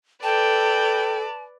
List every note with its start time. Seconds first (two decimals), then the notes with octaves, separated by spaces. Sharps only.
0.23 A4 B4 D5 G5 A5